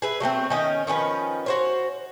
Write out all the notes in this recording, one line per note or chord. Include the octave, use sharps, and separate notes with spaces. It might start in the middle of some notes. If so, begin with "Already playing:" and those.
G#4 B4 E5
F#3 A3 A#3 C4
D#3 C#4 D#5
D#3 F3 C#4 B4
F#4 C5 C#5